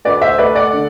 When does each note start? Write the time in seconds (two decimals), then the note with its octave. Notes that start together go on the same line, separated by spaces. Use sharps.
0.05 D2 B4 D5
0.21 C5 E5
0.38 A3 B4 D5
0.55 D5 F#5
0.73 D3